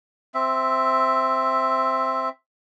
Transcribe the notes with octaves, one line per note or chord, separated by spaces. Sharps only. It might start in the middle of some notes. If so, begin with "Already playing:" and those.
C4 E5